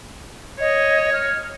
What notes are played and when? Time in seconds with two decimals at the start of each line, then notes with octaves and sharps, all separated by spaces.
0.60 C#5 D#5
1.13 F6